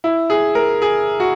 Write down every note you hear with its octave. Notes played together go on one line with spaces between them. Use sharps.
E4
G#4
A#4
G#4
F#4